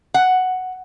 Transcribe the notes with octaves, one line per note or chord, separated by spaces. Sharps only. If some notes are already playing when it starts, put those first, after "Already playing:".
F#5